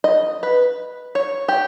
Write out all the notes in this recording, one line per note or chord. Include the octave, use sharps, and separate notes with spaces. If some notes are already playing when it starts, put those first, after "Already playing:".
D#5
B4
C#5
G4